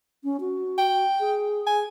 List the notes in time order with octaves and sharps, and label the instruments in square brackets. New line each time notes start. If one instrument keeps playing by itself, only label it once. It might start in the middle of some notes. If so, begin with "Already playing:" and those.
[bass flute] C#4
F#4
[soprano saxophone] G5
[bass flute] G#4
[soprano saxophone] G#5